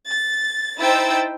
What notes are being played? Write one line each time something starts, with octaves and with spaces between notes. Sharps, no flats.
A6
D#4 E4 C5 G5 E6 A6